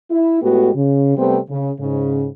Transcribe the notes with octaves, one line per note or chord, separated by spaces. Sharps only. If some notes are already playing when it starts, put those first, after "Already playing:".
E4
A2 G#3 A3 B3 F#4 G4
C#3
C3 G3 A3 B3 C4
C#3
G#2 C#3